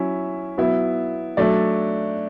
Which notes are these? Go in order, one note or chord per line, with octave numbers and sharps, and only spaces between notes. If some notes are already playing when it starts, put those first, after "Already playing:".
Already playing: F#3 C#4 E4 E5
F#3 B3 E4
F#3 A3 D4 D5